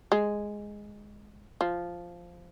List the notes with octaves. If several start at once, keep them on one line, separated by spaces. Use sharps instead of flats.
G#3
F3